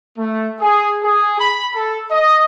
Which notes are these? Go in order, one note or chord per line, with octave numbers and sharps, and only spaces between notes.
A3
G#4
G#4
B5
A4
D#5